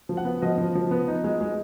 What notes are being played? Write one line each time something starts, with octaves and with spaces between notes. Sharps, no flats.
F3
F#5
B3
F3 D#5
F3
F3
B3
D#4
G#3
G#3